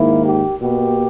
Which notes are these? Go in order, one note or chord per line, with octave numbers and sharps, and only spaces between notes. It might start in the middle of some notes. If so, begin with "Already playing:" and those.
Already playing: G#2 D#3 A#3 E4
G4
B2 A#3 G4